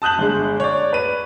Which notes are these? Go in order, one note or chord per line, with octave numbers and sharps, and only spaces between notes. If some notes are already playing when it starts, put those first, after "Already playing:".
A5 D#6 F#6 G6 F#7
G1 G#3
C#5 D5
B4 D#7